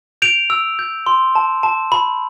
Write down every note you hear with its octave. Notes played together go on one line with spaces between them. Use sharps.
G6 D7 F7
E6
G6
C6
A5
A5
B5